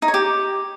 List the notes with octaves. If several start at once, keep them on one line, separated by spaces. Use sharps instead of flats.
D#4
C#5
G4